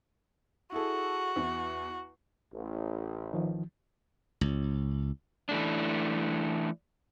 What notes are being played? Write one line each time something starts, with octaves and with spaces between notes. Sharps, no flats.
E4 F#4 G#4 A4
E2
A1
D#3 F3
C#2
E3 A3 D4